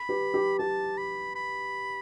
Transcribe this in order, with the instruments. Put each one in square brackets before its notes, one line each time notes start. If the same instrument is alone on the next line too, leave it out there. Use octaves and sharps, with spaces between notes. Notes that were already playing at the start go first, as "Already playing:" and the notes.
Already playing: [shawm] B5
[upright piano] G4 B4
G4
[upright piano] G4 [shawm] A5
[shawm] B5
B5